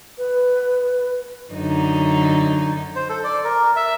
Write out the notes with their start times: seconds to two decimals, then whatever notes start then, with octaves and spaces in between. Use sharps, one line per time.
0.18 B4
1.53 F#2 D3 D#4
2.96 C5
3.09 A4
3.24 D5
3.44 A#4
3.76 E5